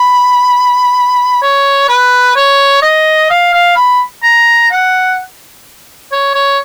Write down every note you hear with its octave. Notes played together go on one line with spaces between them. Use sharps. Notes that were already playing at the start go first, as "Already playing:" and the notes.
Already playing: B5
C#5
B4
C#5
D#5
F5
F5
B5
A#5
F#5
C#5
C#5